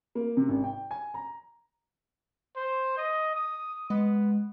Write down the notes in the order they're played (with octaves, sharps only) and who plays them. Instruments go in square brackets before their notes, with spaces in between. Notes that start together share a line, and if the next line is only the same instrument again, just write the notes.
[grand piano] A#3
C3
G#1
G5
G#5
A#5
[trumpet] C5
D#5
D#6
[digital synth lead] G#3 [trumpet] B3